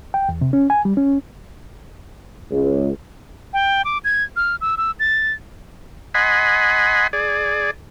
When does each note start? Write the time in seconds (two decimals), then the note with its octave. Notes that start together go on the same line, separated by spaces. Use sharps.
0.14 G5
0.29 E2
0.41 C3
0.53 C#4
0.70 G#5
0.85 G3
0.97 C#4
2.51 C#2
3.53 G5
3.85 D6
4.04 G#6
4.36 F6
4.61 E6
4.77 E6
5.00 A6
6.14 D#5 F#5 G#5 B5 C6
7.13 G#4 D5